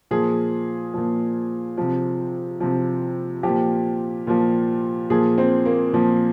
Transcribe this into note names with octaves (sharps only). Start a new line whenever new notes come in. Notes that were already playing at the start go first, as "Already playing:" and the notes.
A#2 F3 G#4
A#2 F3
C3 F3
C3 F3
A#2 F3 G4
A#2 F3
A#2 F3 G#4
C4
A#3
A#2 F3